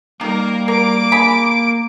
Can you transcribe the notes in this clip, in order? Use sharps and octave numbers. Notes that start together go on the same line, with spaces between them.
D#3 G3 A#3 A#4
A#4 D6 D7
D4 G#4 B5